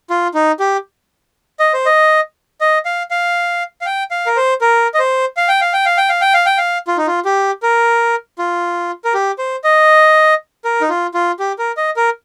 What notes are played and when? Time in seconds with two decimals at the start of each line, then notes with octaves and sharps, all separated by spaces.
0.10 F4
0.34 D#4
0.60 G4
1.60 D#5
1.73 C5
1.86 D#5
2.61 D#5
2.85 F5
3.11 F5
3.81 F5
3.86 G5
4.11 F5
4.26 A#4
4.36 C5
4.61 A#4
4.94 D#5
4.99 C5
5.37 F5
5.48 G5
5.61 F5
5.73 G5
5.86 F5
5.97 G5
6.09 F5
6.21 G5
6.34 F5
6.46 G5
6.57 F5
6.87 F4
6.97 D#4
7.07 F4
7.25 G4
7.63 A#4
8.39 F4
9.04 A#4
9.14 G4
9.38 C5
9.64 D#5
10.65 A#4
10.81 D#4
10.89 F4
11.14 F4
11.39 G4
11.59 A#4
11.77 D#5
11.96 A#4